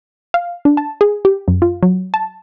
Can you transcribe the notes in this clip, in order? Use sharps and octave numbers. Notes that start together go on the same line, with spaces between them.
F5
D4
A5
G#4
G4
F#2
F4
F#3
A5